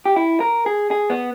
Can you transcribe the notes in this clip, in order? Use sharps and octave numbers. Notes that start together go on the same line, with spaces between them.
G4
E4
A#4
G#4
G#4
B3